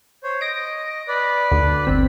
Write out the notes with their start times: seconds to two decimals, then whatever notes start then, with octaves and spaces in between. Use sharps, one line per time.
0.23 C5 C#5
0.41 D#5 A#6 D7
1.08 B4 D5
1.52 D2
1.85 G1 C4 B6